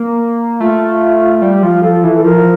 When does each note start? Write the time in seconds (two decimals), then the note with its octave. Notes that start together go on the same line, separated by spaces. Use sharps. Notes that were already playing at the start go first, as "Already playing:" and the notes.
Already playing: A#3
0.60 A3 F4
1.42 G3
1.63 F3 F4
1.83 F3 A4
2.04 E3
2.15 A4
2.24 F3 A#4